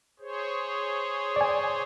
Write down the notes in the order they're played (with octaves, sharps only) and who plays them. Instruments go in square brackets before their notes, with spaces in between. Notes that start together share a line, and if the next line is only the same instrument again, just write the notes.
[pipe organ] G#4 C5 C#5
[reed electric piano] D5 G#5